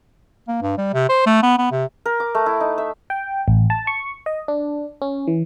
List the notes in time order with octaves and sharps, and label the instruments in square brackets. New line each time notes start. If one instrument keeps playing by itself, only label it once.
[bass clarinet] A#3
G2
G3
C3
C5
A3
B3
B3
C3
[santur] A#4
D6
A3
E4
D#4
E5
[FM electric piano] G5
A1
A5
C#6
D#5
D4
C#4
E3